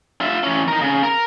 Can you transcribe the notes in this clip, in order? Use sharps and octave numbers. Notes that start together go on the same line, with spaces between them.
F4 E5
E3 C#4
D#4 A#4
C#3
A#4